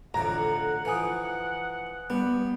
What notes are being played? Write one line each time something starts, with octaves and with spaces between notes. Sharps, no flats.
A1 F2 D3 F#5 A#5
E3 F3 B4 G#5 D#6
G3 B3